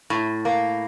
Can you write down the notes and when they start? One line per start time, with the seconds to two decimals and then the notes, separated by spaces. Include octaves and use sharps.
0.10 A2
0.45 A#3